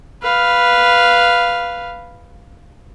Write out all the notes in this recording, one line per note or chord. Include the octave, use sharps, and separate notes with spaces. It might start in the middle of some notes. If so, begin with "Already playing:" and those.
B4 F5